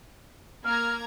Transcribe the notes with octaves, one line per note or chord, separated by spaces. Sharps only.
A#3 A#5 F6 G#6